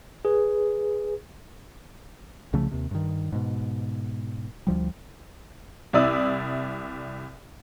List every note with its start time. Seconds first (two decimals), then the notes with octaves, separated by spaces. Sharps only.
0.25 G#4 B4
2.53 C2 C#3 F3 A3
2.71 D#2 C3
2.91 G2 D#3
3.32 G#2 B2
4.67 D2 F3 G3
5.93 C2 E4 D5 D#6 E6